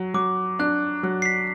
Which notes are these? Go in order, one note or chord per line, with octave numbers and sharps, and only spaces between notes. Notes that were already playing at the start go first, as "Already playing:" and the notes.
Already playing: F#3
F#3 D6
D4 F#6
F#3
C7
B6